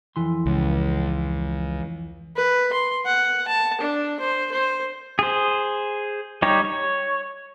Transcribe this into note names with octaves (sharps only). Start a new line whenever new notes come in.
F2 E3 C6
C#2
B4
C6
F#5
A5
D4
C5
C5
G#4 C5
G3 D#4 G4 C#5
C#5